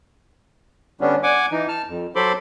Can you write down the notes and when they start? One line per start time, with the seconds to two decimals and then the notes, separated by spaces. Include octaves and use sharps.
1.01 D3 G3 B3 C#4 D4
1.23 F#5 G#5 D6
1.52 E3 D#4
1.68 A5 F6
1.88 F2
2.15 F#3 A4 C5 B5 C6 D6